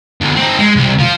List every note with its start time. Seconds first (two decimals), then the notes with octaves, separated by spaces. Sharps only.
0.21 D2 B2
0.36 C4 D#4
0.59 G#3
0.76 C2
0.99 F3 F4